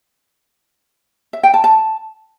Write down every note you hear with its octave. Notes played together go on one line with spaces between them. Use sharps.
E5
G5
A5
A5